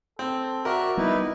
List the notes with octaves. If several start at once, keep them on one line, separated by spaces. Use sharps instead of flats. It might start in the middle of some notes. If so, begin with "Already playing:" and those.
C4 A4
F#4 A#4 D5 E5 F#6
G3 B3 D#4 E4 B4